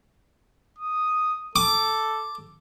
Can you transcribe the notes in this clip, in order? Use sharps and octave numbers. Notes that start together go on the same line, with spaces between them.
D#6
A4 D6